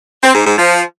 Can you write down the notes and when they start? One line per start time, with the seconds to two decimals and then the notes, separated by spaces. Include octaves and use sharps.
0.22 C4
0.33 G#2
0.45 G#2
0.57 F3